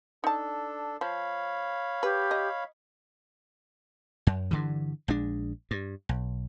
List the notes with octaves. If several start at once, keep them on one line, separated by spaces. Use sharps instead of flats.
D4 D#4 A4 A5
F3 C#5 F5 B5
G4 B4
D#5
F#2
G2 D3 E3
A#1 G#3 D4
G2
B1